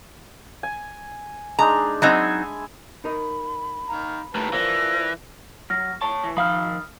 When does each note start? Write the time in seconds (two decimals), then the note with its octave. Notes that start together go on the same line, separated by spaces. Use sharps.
0.63 G#5
1.59 G#3 D4 D#4 A#5
2.02 F#3 C4 D#4 E5 G#5 B5
3.04 D#4 A#4 D#5 B5
3.89 D#3 F5 A#5
4.35 D#2 A2 A3 B4 A5 A#5
4.53 E3 F3 A#4 C5 D5 F5 A#6
5.70 F#3 F6 A#6
6.01 C#5 A5 C#6
6.24 E3
6.37 D#3 F3 F5 B5 D#6 F6